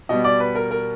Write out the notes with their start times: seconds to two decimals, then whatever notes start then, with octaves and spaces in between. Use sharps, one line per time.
0.09 B2 G3 B3 D#5
0.24 D5
0.40 B4
0.55 A#4
0.71 A#4